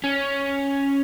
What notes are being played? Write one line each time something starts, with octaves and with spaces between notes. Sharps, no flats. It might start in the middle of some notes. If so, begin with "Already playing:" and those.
C#4